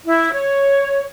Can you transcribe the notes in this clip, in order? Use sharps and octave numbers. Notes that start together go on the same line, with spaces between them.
E4
C#5